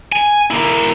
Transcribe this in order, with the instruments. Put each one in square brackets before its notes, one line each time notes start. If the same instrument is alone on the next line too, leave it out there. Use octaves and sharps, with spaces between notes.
[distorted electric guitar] G#5
A#3 E4